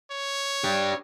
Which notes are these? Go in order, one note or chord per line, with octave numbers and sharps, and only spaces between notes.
C#5
D4 G4